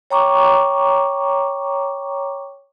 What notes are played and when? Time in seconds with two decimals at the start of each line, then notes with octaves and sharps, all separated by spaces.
0.10 C#5 G5 A#5 C#6 D6